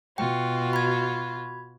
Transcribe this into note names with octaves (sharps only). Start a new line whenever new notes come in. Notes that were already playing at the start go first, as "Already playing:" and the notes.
B2 F4 F#4 G5
B5 G#6